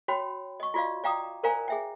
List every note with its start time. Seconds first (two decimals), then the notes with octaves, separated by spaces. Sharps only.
0.08 F#4 C#5 G5 B5
0.60 D#5 C#6
0.74 F4 F#4 D5 D#5 F5
1.04 D5 F5 G5 A#5 D6 D#6
1.43 A#4 C5 D5 F5 G#5 A#5
1.68 G#4 E5 G5